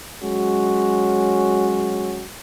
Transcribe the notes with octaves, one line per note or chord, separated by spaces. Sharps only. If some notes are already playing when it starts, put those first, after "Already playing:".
F#3 G#3 C#4 F#4